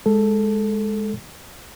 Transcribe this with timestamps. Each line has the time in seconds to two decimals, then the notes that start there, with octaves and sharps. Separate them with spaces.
0.06 G#3 A4